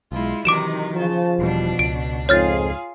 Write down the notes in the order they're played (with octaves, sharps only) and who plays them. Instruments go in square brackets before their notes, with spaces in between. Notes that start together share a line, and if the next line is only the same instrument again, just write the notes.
[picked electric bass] B1 [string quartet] G#3 E4 F4
[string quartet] C3 D#3 D#4 [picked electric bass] E3 F#3 [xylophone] D6 D7 E7
[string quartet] C#3 A5 [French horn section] F3
[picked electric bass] E1 E3 G3 [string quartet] B2 D4
[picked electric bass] C#2 [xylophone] D7
[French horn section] F2 G#2 [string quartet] F4 G#4 F5 [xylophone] C#5 F6 A6